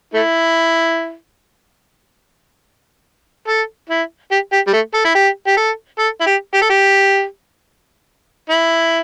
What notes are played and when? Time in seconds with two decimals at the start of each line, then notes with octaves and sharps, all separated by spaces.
0.14 A3 E4
3.48 A4
3.89 E4
4.31 G4
4.53 G4
4.67 G3
4.73 A3
4.94 A4
5.05 E4
5.15 G4
5.47 G4
5.57 A4
5.99 A4
6.20 E4
6.26 G4
6.54 G4
6.62 A4
6.70 G4
8.50 E4